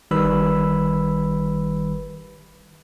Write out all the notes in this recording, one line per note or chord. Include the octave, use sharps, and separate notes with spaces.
G1 D#3 G3 B4 B5 E6